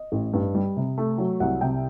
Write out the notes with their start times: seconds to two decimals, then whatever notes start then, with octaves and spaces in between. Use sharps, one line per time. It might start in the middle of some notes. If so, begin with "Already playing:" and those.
Already playing: D#5
0.12 A1
0.33 G2
0.55 G3
0.77 C3
0.98 A3
1.18 F#3
1.40 C2 F#5
1.61 C3 G5